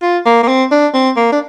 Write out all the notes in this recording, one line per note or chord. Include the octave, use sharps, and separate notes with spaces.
F4
A#3
A#3
C4
D4
C4
A#3
D4